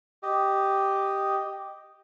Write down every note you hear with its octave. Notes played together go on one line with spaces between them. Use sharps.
G4 D#5